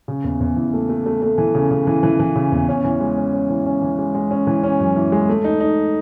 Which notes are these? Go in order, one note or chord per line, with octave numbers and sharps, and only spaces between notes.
C#3
E2
E2
E3
A3
A3
A3
A3
E3
C#3
C#3
E3
E3
E3
C#3
E2
C#4
E3
G#3
C#4
C#4
E3
C#4
E3
G#3
G#3
C#4
E3
C#4
F#2
E3
G#3
A3
D#4
D#4